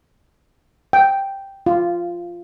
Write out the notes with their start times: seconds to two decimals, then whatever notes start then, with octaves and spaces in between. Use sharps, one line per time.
0.93 G5
1.66 F4